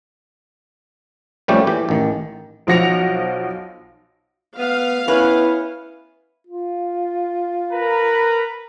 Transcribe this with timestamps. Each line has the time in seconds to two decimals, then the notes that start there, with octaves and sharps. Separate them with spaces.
1.48 A#2 F3 G3 A3 C#4 G4
1.67 E3 G4
1.89 A1 D#3
2.67 B1 F3 F#4 A#6 C#7 F7
4.58 B3 F5
5.08 B3 C#4 E4 B4
6.47 F4
7.73 A#4 B4 A#5